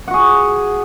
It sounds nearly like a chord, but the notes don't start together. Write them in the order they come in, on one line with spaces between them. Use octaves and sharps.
F#5 F#4 G#4